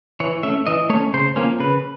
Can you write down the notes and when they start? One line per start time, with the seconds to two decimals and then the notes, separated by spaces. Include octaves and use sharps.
0.20 E3 C#5
0.43 A3 C#4 E5
0.67 E3 D#5
0.90 A3 C#5
0.94 C#4
1.14 C#3 C5
1.36 F3 A#3 C#4
1.60 C#3 B4